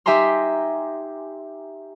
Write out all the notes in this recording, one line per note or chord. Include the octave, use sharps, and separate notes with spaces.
D#4 G4 E5 G#5 A#5 C6